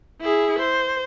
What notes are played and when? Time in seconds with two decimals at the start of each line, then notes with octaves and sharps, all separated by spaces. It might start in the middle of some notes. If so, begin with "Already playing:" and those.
0.21 E4 G#4
0.59 C5